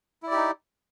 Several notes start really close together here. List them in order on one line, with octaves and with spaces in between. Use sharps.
E4 D5 G4 D#4